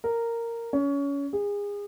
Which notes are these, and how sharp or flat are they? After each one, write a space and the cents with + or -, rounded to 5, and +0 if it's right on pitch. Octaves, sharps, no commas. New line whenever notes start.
A#4 -10
C#4 +25
G#4 -30